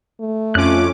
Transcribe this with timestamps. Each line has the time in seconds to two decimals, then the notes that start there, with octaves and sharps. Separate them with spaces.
0.20 A3
0.55 F2 C#4 F4 D6 F#6